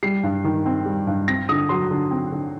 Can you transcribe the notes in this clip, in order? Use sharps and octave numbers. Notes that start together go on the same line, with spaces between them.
G3 C7
G2
D#3
C4
G3
G2
C4 A#6
D3 D#6
F#3 C6
D3
C4
D3